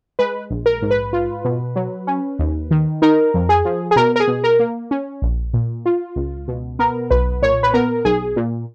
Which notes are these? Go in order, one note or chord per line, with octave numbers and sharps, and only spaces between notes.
G#3 B4
A#1
A#4
G#2
B4
F4
B2
F#3
C#4
D#2
D#3
D#4 A#4
F2
G#4
F3
G#4
B2 A#4
A#4
G#4
B2
A#4
A#3
C#4
A#1
A#2
F4
C#2
B2
B3 A#4
B1 B4
A#2 C#5
B4
B3 A#4
B1 G#4
A#2